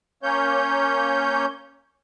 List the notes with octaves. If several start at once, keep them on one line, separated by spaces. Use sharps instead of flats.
A#3 C#4 C#5 G6